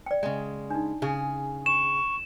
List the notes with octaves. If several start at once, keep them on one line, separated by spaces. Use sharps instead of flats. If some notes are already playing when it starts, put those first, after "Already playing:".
D5 G5
C#3 G#3
D4 D#4
C#3 G#4
C#6 E7